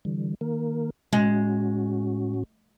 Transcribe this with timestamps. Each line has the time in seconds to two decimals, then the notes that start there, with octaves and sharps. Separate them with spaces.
0.05 D3 E3 G3
0.41 D#3 A#3 A#4
1.13 A2 G#3 C#4 F#4